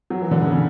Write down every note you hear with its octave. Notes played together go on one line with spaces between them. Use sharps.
F#3
E3
D3
C#3
C#3